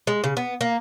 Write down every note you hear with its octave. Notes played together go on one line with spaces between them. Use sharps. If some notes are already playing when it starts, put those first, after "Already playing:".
G#3
C#3
B3
A#3